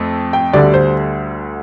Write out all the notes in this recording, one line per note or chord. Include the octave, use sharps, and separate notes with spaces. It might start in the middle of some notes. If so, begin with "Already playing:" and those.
Already playing: F2 A3
G5
D2 D3 G3 D5
C5